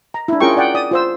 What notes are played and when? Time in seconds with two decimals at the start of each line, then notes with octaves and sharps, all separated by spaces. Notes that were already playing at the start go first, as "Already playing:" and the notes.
0.14 A#5
0.28 D4 E4
0.40 C#4 F4 G#4 A#4 G5 C#6
0.57 D5 F#5 G5
0.74 D5 D#6
0.91 F4 C5 E6